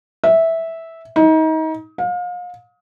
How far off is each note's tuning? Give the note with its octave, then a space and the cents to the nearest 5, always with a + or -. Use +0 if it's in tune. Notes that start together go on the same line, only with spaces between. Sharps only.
E5 -10
D#4 +30
F5 +35